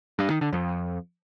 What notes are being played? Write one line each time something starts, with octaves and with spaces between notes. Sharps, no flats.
G2
D#3
D3
F2